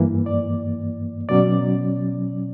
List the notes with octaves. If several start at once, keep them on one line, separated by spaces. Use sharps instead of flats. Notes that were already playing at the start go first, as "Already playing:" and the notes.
Already playing: G2 E3 A#3
D5
B2 F#3 C#4 D5